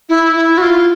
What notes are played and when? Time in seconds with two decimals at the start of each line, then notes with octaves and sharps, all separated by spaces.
0.09 E4
0.36 E4
0.58 F#4
0.62 F4